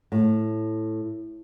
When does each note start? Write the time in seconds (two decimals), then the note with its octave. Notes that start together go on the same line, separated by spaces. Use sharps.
0.12 A2